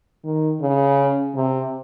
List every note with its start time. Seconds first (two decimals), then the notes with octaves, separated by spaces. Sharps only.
0.24 D#3
0.61 C#3
1.35 C3